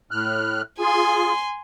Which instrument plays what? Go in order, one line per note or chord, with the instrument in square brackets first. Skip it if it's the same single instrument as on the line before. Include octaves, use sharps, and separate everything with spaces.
[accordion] A2 F6 F#6
[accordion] F4 G#4 [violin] G#5 C6